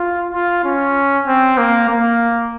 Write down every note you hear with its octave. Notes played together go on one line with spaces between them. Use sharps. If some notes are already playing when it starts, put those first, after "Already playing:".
Already playing: F4
F4
C#4
C4
A#3
A#3